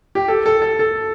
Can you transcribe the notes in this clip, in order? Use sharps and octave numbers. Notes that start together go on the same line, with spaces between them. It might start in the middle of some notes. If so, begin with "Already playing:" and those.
G4
A4
A4
A4
A4